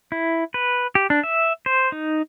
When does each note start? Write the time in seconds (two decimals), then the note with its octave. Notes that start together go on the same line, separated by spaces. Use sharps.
0.12 E4
0.54 B4
0.95 G4
1.10 D4
1.23 E5
1.66 C5
1.92 D#4